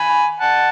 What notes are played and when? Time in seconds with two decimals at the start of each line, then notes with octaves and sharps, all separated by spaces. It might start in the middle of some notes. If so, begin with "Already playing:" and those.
Already playing: G#5 B5
0.40 F#5 A5